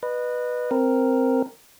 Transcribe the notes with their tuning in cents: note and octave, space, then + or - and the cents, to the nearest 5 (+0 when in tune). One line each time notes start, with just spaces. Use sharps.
B4 -5 D#5 -30
C4 +0 A#4 +0